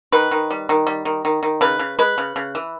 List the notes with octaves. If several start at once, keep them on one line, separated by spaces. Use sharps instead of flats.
D#3 B4
D#3
G3
D#3
G3
D#3
D#3
D#3
C#3 B4
C#3
G#3 B4
C#3
C#3
E3